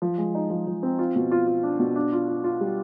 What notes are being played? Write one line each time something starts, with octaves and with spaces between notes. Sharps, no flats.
F3
G#3
D#4
F3
F3
C4
F4
B2
F4
F4
D4
B2
D4
F4
F4
F4
G3